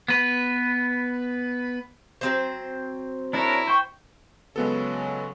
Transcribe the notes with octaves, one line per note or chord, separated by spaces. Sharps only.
B3 B4
F#3 C4 C5
D4 E4 A#4 C#5 A#5
C5 G5 C#6
C#3 F#3 G#3 B3 A4